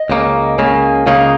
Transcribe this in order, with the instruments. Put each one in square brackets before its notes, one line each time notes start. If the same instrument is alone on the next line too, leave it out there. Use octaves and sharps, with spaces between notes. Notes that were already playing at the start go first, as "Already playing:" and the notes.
Already playing: [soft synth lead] D#5
[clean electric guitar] C#2 C#3 A#3
[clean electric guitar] C#2 C#3 A#3 [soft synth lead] G#5
[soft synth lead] G#5
G#5
[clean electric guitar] C#2 C#3 A#3 D#4 [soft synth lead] F5
[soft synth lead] F5